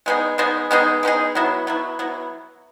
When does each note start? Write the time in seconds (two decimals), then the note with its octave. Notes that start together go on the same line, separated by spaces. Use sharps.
0.06 G#3 B3 D#4 G#4
0.38 G#3 B3 D#4 G#4
0.71 G#3 B3 D#4 G#4
1.03 G#3 B3 D#4 G#4
1.35 F#3 B3 E4
1.67 F#3 B3 E4
1.99 F#3 B3 E4